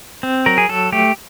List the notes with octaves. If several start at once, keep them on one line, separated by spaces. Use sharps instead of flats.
C4
F#3 A#4
G#4
F#3 A4
A3 G4